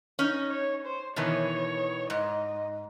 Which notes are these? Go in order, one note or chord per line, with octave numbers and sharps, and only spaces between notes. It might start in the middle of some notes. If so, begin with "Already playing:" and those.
C#4 D#4
C#5
C5
B2 D#3 E3 C#5
G#2 D#5